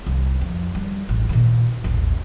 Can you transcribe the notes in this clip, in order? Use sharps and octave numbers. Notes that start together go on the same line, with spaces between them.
C2
F2
G3
A1
A#2 D#3
A1 D#2